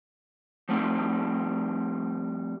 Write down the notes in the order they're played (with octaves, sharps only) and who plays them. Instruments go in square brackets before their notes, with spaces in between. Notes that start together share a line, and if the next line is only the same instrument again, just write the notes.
[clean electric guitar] F3 G3 A3 C4